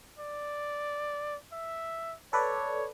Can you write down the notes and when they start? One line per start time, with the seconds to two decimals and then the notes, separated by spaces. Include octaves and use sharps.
0.18 D5
1.53 E5
2.33 A4 B4 C#5 D5